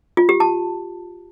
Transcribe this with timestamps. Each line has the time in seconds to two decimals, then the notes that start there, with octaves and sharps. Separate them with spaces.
0.17 F4
0.29 G4
0.40 A5